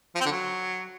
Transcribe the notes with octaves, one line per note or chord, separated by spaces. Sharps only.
F3
C4
D3
F#3